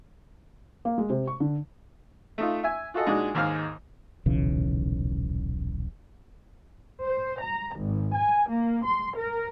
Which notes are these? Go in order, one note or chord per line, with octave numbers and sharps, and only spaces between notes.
A#3
G#3
C3
C#6
D3
A3 D#4 F4
E5 G#5
F4 F#4 G#4 A4 D#5
A#2 G#3 D4 D#4 F#4 G#4
D#2 G#2 G#3 F5 F6
D#1 B1 C#3 E3
C5
A#5
G#1
G#5
A#3
C6
A#4